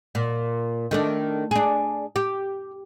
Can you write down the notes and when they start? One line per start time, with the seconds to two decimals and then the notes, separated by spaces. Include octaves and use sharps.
0.15 A#2
0.91 D#3 A3 D4
1.51 D4 G#4
2.16 G4